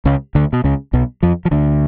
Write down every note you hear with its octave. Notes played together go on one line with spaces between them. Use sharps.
C#2 C#3
D2 D3
B2
C#2 C#3
B1 B2
F2 F3
F3
D2 D3